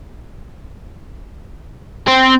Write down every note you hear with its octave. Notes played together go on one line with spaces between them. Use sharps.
C4